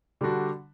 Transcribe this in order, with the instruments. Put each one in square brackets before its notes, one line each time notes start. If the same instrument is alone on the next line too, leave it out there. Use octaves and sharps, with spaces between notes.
[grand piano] D3 G3 D4 F#4